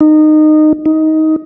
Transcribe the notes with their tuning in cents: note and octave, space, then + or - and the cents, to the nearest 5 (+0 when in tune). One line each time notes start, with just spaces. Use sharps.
D#4 -20
D#4 +15